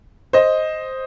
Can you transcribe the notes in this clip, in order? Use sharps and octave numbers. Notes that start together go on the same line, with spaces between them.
C5 D#5